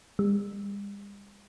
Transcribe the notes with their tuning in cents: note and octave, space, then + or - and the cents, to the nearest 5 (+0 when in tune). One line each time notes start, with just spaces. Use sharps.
G3 +45